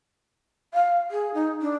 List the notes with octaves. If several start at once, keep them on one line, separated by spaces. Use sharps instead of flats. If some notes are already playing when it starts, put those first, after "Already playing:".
F5
G#4
D#4
D4